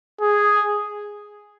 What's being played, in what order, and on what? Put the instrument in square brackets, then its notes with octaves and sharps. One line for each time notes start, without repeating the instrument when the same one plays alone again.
[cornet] G#4